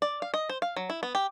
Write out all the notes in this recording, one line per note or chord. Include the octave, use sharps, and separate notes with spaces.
D5
F5
D#5
C5
F5
F#3
E4
B3
G4